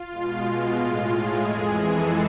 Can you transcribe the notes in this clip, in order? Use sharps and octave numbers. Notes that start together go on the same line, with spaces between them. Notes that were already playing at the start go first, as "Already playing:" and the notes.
Already playing: F4
B2 G#3
F4
A2 G#3
G#4
F2 E3 G#3
A4